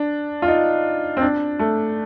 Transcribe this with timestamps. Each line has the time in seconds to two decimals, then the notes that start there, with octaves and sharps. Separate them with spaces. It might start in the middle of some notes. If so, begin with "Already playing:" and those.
Already playing: D4
0.42 F4
0.48 D#4
1.17 C4
1.22 D4
1.59 A3